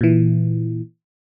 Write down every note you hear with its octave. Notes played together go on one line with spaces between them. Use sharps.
A#2 E3